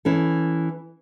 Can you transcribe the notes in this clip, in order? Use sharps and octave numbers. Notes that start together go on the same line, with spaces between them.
E3 C#4 A4